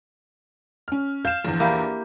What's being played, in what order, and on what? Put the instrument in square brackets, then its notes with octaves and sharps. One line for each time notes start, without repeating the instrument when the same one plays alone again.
[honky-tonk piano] C#4 F6
[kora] F5 [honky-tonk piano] G6 E7
[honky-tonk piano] A#1 E2
[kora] A#3 E4 G4